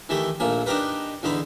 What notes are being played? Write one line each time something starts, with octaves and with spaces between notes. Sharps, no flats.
D#3 E3 A3 G4
A#1 A3 A#3 G#5
D4 D#4 G4 A#4 B4
E2 D3 D#4 B5